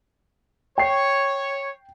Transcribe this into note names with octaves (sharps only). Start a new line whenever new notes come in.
C#5 G5 C7